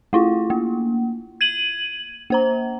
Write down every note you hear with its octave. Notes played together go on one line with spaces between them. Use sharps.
A3 E4 F4
A#3
G#6 D#7 F#7
A#3 C5 A#5